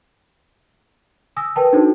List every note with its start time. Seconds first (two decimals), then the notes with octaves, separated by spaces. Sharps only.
1.37 G#5 D#6 E6 A#6
1.56 A#4 B4 G5 A5
1.73 D4 D#4 F#4 A4 C5